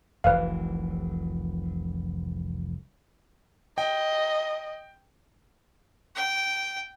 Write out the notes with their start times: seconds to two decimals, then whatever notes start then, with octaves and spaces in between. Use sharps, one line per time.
0.24 F1 C2 E3 B4 F5
3.78 D#5 G5
6.15 G5